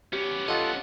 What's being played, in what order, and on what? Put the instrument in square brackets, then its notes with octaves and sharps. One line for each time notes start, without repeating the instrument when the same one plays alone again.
[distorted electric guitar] B3 C#4 [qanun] G4
[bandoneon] F4 A4 [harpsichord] D#5 F#5